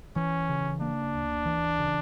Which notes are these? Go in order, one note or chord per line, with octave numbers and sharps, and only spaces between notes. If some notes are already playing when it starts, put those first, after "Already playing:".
E3 C#4
C#3
A#3 D4
D2
E3
C#3